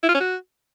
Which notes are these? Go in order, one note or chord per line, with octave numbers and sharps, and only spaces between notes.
E4
F4
C#4
F#4